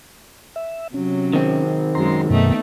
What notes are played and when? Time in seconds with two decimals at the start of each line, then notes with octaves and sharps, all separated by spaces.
0.56 E5
0.94 C3 F#3 C#4
1.33 D#3 C4
1.95 F#2 G#3 A#5 C6
2.30 F#2 B2 A3 B3 D#4